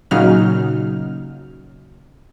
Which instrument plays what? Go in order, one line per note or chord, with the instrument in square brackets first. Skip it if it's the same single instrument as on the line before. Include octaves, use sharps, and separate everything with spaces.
[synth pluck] A#2 C#3 F#3 D#4 F6